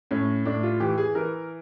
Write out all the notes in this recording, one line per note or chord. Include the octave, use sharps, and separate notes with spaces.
A2 C#4
A2 D4
F4
E3 G4
G#4
E3 A#4